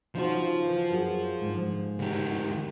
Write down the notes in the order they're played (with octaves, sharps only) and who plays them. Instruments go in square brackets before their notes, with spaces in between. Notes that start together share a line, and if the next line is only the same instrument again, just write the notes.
[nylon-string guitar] C#3 D#4 F#4 [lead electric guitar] F3 C5
[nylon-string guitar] E3
F#2 F#4 G#4
G#2 D3 G#3
[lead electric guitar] D2 G4